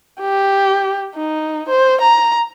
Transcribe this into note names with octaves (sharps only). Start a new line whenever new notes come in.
G4
D#4
C5
A#5